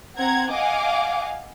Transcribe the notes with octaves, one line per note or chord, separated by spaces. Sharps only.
C4 F#5 A#5 G#6
D#5 F5 F#5 G#5 D6